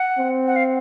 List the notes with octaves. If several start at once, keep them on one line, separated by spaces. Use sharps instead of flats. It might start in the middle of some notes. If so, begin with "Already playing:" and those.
Already playing: F#5
C4
F#5
F5